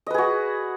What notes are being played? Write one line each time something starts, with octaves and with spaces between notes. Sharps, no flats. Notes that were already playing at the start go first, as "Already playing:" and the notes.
F#4 G#4 B4 D#5